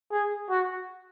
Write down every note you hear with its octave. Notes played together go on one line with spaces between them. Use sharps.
G#4
F#4